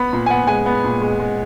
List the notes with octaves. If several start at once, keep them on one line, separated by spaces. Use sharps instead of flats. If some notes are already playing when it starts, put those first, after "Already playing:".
Already playing: B3 B5
A#2
G#5
B3 F#5
G#3 G#5
B3
A#2
G#3
G#3